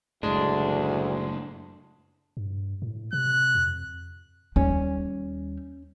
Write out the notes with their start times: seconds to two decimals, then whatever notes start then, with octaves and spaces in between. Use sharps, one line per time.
0.23 F#1 D2 A2 G#3 D4
2.37 G2
2.82 A2
3.13 C3 F#6
3.55 F2
4.56 D#2 G3 C#4